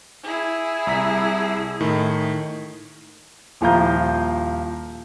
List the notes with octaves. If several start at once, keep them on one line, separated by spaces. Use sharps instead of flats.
E4 G#4
C2 A#5 B6
A2 D#3
D#1 F3 E4 F5 A#5 G6